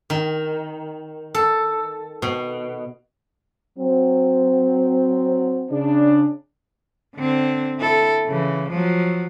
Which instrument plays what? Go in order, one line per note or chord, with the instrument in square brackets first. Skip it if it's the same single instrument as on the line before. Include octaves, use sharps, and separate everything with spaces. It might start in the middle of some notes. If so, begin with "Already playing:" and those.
[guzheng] D#3
A4
B2
[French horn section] F#3 C4
[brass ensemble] C#3 D4
[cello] D3 C4
E4 A4
C#3 E3
F3 F#3